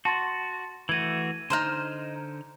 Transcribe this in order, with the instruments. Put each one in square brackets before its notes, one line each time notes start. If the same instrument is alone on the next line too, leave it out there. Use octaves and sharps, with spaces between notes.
[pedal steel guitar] F#4 [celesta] A5 C6 A6
[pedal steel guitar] E3 A3 F#4 [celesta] G#6 D#7
[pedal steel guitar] D3 C5 F6 [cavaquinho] D#4 A#5 C6